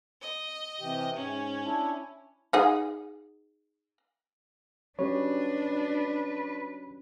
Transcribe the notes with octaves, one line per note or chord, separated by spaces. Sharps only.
D#5
C3 E3 G4
G#2 C#4
D4 E4
D#4 G#4 F#5
F#3 C#4 D4 G4 B4 C#5